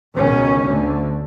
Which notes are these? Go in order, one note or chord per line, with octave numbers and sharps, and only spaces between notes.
C#2 B2 D#3 C#4
D2 D3